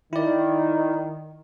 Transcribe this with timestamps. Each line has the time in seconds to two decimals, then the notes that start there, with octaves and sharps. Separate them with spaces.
0.13 D#3 E4 D5